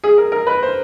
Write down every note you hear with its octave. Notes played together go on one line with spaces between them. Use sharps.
G#4
A#4
A#4
B4
C5